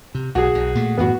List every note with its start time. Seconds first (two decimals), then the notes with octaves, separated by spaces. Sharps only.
0.15 C3
0.35 B1 F#4 G#4
0.55 B1
0.75 A#2 A3
0.98 F#2 A2 E3 B3 F#4